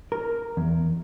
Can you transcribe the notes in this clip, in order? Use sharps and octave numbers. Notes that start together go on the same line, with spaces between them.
A#4
E2